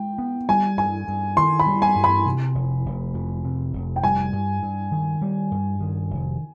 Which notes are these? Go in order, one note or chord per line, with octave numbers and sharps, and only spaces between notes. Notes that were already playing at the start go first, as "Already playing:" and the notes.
Already playing: G#3 G5
B3
G3 G#5
G2 G#5
G2
D#3 C6
B5
G3
G#5
G2
B5
C3
F1
F1
F2
C3
F1
G5
G3 G#5
G2
G2
D#3
G3
G2
D#3
F1